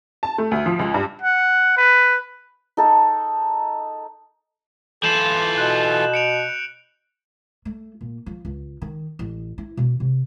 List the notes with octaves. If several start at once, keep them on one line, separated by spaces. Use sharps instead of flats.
A5
A3
D2
F3
C#2
G2
F#5
B4
D#4 A4
E3 F4 A4 G6 E7 F#7
B2 F#6
C#7 D7 F7
A3
A#2
F3
C#2
D#3
A1
E4
B2
C3